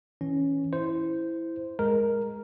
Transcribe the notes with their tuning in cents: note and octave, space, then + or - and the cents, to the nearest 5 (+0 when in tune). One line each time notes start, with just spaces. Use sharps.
E3 -15 C#4 +0
E4 +0 C5 -10
G#3 +0 A#4 +0